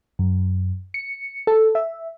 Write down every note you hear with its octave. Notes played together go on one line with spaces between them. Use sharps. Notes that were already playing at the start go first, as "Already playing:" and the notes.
F#2
C#7
A4
E5